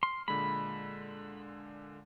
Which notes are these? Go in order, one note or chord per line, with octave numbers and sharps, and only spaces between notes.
C6 F6
A#2 D3 G#3 B5